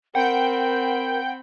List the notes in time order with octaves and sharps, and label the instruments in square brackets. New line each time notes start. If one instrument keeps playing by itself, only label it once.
[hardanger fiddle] C4 B5 [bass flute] A#4 [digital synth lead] F#5 [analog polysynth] G5 G6